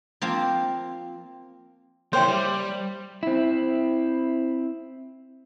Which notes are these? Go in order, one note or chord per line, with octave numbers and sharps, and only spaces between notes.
F3 A#3 C4
A#3 E4 C5 C#5 G5 C6
G3
C4 E4